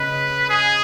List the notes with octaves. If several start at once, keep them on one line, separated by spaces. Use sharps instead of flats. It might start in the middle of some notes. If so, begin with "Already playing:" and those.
Already playing: C#3 B4 D#5
G#4